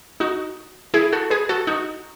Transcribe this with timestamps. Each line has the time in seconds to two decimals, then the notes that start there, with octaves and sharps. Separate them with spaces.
0.20 D#4 F#4
0.94 E4 G#4
1.13 F#4 A4
1.30 G#4 B4
1.49 F#4 A4
1.67 D#4 F#4